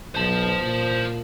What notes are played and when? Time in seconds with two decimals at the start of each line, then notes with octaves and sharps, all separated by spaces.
0.15 B1 C5 A5
0.62 A#2